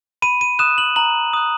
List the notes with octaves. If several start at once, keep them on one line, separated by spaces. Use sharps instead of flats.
B5 D#7
D#7
D#6 F#6 E7
F#7
A#5 F#7
D#6 F#6